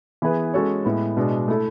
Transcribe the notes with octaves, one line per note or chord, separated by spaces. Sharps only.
E3 B3 E4 G#4 B4
G#3 C#4 F#4 A4 C#5
A2 G#3 B3
B2 G#3 D4
A3 E4 A4